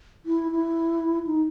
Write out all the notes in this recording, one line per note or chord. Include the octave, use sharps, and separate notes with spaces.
E4
E4
D#4